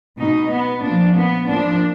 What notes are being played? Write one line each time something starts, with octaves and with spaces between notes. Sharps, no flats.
B2 D#4
B3
A#2 F3 D4
B3
A#2 F3 D4